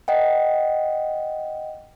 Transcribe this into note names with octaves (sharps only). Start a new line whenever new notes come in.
D#5 F#5 G5